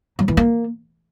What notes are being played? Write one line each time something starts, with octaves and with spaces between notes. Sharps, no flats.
F#3
E3
A#3